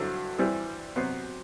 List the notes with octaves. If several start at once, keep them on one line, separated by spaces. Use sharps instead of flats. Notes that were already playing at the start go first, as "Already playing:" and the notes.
Already playing: G2 D3 F#3 C4 E4
E3 G3 C4 E4
C3 F#3 B3 F#4 C5